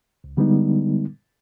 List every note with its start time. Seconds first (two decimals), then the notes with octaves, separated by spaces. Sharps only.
0.24 C#2
0.37 D3 G3 G#3 B3 D#4